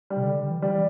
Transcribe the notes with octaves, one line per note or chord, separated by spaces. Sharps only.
G3
C3
D3
E3
E3 G3